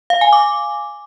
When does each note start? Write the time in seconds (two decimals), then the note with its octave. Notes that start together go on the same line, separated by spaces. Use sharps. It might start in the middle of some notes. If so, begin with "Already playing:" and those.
0.10 F5
0.21 G#5
0.33 D6